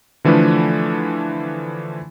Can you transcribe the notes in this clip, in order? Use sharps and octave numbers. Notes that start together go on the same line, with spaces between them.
D3 E3 F3 A3 D4 B4